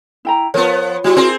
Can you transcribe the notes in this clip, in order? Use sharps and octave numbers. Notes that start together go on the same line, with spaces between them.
E4 G5 A#5
F3 B3 F4 A#4 C#5
G3 E4 F#4
C4 G#4 A#4 C6